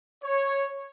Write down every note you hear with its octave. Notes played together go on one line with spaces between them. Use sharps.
C#5